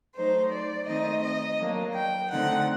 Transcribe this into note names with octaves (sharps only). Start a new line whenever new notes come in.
F#3 A3 D#4 C5
D5
D#3 A3 C4 D#4 D#5
D#5
F#3 A#3 D4
G5
D3 A3 C4 D#4 F#5